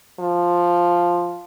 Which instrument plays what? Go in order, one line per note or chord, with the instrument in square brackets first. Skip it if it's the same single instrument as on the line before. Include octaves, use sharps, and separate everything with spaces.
[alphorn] F3